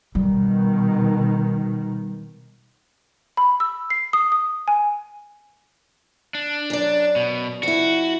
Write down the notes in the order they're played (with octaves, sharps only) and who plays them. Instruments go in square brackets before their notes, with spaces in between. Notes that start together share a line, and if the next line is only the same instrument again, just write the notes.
[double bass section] B2 D#3 [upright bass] G3
[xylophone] B5
E6
C7
D#6
D#6
G#5
[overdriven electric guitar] D4
[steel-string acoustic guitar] F#2 D5
[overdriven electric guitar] B2
[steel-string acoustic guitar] F2 E4 [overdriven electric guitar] F#4